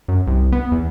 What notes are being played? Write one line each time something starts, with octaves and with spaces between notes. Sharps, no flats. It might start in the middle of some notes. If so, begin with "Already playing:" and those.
F#2
C2
B3
E2